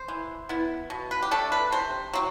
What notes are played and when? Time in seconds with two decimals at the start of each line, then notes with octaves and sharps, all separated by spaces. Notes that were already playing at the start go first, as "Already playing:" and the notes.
Already playing: C5
0.08 E3
0.49 B3 E4
0.90 B2
1.11 B4
1.22 G4
1.31 A3 D4 A4
1.52 B4
1.72 C3 C5
2.13 F#3 C4